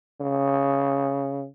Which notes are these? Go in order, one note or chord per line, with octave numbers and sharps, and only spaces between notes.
C#3